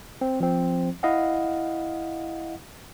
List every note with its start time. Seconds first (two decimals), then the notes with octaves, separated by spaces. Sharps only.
0.21 C4
0.40 F3 C4
1.03 E4 D#5 F5 F#5